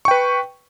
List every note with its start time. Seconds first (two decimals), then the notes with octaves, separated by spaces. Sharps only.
0.05 C#6
0.08 G5
0.11 B4